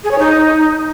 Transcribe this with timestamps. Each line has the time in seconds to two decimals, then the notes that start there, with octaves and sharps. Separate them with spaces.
0.04 G#4
0.11 C#5
0.19 D#4